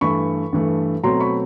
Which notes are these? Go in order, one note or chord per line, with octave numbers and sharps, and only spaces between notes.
G2 E3 A3 B5 C#6
G2 E3 A3
B2 F#3 A3 C4 A#5 C6
B5 C#6